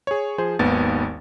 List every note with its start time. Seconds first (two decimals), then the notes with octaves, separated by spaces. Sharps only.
0.07 G#4 C#5
0.38 F3 G#4 C5
0.59 G#1 D#2 B3 A6